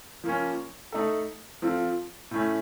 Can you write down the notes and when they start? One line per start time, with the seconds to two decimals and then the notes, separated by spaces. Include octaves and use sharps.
0.24 F3 A#3 C#4
0.92 A3 D#4 A4
1.62 F3 C4 F4 A4
2.31 A2 A3 C#4